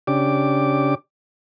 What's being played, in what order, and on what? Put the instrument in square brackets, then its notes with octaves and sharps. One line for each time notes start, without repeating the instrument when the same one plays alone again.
[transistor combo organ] C#3 D4 G4 D6